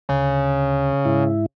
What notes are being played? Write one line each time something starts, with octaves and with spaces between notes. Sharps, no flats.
D2 C#3
G#2 E4